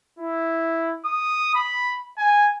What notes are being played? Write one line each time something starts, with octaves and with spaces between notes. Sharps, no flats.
E4
D#6
B5
G#5